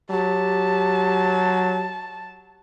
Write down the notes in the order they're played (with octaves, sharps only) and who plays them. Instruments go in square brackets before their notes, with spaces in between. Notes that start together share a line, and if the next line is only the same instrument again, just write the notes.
[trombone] F#3 [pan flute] G4 [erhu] A5